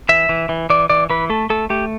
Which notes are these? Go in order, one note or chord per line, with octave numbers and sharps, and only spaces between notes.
E3 E5
E3
E3
E3 D5
E3 D5
E3 B4
A3 A4
A3 A4
A3 G4